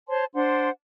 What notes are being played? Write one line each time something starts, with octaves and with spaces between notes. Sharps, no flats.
C5 C#5 A5 C6
D4 C5 F#5 C6